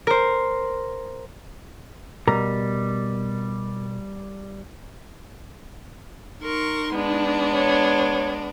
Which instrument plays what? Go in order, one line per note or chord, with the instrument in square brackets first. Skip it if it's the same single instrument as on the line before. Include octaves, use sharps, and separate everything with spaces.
[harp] A#4 C5
[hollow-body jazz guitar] B2 A#4 A#5 [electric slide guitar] G3
[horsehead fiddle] D#4 [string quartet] A#4 C6 C#6
[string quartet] G#3 B3 D4
[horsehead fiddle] C#5